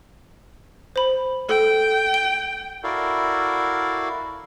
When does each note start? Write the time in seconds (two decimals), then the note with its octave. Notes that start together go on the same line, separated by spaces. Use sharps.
0.96 C5 B5
1.49 A4 G5
2.14 G7
2.84 E4 F#4 A4 A#4 D5 F5